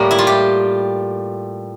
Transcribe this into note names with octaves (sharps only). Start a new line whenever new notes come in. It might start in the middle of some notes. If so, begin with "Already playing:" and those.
Already playing: A2 G3 A#3
E4
F4
G4